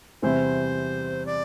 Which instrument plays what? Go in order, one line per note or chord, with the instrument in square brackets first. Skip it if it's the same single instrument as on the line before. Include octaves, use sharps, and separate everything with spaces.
[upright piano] E2 C3 G3 C4 E4 [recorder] C5
[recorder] D5